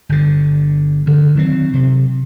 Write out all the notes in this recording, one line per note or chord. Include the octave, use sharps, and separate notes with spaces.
G1 D3
D2 D3
D#3 F#3 G#3 C4
C3